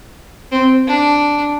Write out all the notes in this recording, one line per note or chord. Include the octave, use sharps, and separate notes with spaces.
C4
D4